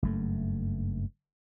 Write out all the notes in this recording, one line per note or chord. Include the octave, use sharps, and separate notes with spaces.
F#1 G2 A3